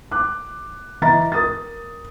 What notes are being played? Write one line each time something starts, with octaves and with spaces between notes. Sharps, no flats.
D6 F#6
E3 D#5 E5 A#5 A6
A#4 D#6 A6